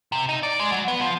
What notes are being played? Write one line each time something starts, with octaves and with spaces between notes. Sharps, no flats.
C3
D#4
D5
G#3
F#3
B3
F3